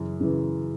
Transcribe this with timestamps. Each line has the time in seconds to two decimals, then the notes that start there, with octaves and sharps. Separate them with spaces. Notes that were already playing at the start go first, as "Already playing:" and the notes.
Already playing: F#2 C#3 E3
0.21 C#3 E3